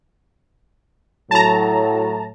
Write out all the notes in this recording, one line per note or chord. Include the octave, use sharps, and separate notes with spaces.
A2 F#3 A5 A#5